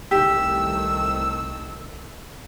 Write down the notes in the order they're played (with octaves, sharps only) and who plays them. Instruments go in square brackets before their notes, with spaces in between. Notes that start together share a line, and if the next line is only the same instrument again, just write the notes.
[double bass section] C2 D#3 A3 [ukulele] G4 [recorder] E6